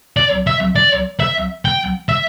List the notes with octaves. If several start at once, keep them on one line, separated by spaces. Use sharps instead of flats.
D5
E5
D5
E5
G5
E5